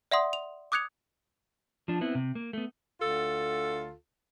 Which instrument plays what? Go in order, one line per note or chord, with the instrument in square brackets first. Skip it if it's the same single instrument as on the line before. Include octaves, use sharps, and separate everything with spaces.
[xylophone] D5 E5 F#5 C6 D#6
F7
D6 D#6 F#6 G#6 C#7 F7
[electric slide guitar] F3 D4
B3 C4 E4
C3
A#3
A3 B3
[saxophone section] D2 F4 A4